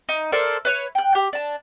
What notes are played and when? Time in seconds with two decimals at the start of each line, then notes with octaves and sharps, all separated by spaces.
0.09 D#4
0.32 A4 A#4 C5 D5
0.65 B4 C#5
0.95 G5 F#6
1.15 G4
1.33 D4 A5